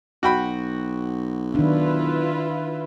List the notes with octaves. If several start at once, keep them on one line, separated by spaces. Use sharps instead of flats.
B1 F#4 G5 B5
D#3 D4 E4 F4 B4